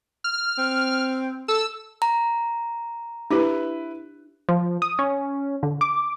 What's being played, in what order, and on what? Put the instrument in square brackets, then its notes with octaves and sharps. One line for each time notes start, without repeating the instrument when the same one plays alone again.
[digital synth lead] F6
[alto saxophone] C4
[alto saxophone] A4 [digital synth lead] E6
[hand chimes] A#5
[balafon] D4 G4 [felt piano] E4 B4
[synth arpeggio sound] F3
D#6
C#4
D3
D6